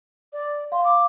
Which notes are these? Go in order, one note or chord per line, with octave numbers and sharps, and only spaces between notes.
D5
F5 C6
D6